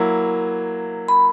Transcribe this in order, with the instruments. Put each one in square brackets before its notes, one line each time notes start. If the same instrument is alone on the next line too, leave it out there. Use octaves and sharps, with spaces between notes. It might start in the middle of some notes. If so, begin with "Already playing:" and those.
Already playing: [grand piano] F#3 A#3 E4
[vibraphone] B5